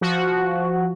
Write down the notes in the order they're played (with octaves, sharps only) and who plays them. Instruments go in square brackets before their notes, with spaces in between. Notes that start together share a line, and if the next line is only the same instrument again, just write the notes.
[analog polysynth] F3 F#4